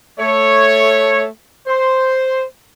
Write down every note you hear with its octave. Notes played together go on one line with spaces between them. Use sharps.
A3 C#5
C5